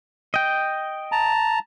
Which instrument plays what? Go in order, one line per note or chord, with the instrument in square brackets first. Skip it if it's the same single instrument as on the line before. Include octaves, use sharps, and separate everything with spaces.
[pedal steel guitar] D#5 G5
[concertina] A5 A#5